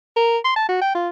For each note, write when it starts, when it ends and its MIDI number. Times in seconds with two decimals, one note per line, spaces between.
0.16 0.38 70
0.44 0.52 84
0.56 0.66 81
0.69 0.79 66
0.81 0.94 79
0.95 1.09 65